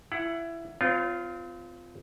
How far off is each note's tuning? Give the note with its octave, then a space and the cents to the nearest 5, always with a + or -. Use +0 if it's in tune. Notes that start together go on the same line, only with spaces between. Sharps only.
E4 +20 F#5 +0
C4 -35 F4 +0 C#5 +0